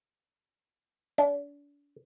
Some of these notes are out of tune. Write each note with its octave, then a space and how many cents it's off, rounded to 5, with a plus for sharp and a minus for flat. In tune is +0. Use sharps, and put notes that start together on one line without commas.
D4 -35